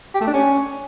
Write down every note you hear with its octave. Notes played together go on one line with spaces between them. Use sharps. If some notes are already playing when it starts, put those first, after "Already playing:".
G4
A3
D4
C#4